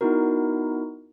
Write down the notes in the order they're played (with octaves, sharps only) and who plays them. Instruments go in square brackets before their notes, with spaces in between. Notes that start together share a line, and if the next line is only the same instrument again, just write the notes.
[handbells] B3 D#4 E4 F#4 A#4